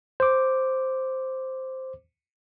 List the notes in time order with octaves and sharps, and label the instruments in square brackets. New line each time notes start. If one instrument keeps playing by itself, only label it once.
[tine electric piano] C5 D6